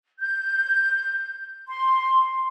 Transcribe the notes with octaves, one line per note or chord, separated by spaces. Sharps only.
G6
C6